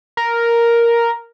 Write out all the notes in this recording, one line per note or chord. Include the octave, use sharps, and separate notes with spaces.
A#4